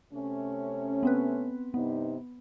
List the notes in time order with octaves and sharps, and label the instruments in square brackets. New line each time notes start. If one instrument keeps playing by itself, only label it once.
[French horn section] C3 A3 C#4
[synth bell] B3 C4 B4
[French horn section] G2 C3 D#4 [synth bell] B3